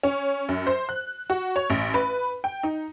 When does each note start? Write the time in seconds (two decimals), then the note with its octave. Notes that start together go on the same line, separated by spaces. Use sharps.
0.03 C#4
0.49 F#2
0.67 C5
0.89 F#6
1.30 F#4
1.56 C#5
1.70 A1
1.94 B4
2.44 G5
2.63 D#4